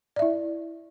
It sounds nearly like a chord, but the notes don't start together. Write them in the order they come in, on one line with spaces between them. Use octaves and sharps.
D5 E5 E4